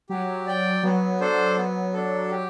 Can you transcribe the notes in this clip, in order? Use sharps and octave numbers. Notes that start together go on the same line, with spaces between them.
F#3 G4
D5 G5
F#3 B3
D4 A4 C5
B3
D4 A4
G4